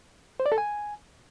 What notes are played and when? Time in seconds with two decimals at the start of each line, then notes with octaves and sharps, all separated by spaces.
0.40 C5
0.46 D5
0.52 A4
0.58 G#5